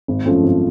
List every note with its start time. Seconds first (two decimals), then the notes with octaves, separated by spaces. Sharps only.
0.08 G#1
0.26 F#2 C#3 F3 A3
0.44 G#1